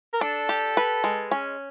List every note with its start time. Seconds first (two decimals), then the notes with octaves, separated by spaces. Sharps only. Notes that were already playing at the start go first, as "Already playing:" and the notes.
0.13 A#4
0.21 D4 A4
0.49 G4
0.77 B4
1.04 G#3
1.31 C#4